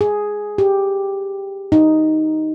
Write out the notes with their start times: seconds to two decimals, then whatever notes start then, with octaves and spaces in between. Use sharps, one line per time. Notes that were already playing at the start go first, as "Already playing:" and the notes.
0.01 G#4
0.58 G4
1.72 D#4